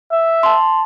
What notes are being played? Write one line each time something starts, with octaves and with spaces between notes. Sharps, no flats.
E5
A5 C6